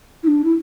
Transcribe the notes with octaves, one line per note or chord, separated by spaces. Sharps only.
E4
D4
E4